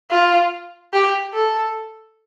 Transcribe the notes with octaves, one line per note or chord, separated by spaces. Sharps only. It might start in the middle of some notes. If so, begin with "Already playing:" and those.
F4
G4
A4